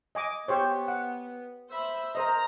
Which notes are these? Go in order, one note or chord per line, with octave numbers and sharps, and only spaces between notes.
D#5 G#5 D6
B3 G4 C5 C#5
F#5
C5 E5 B5
A#4 C5 D#5 A#5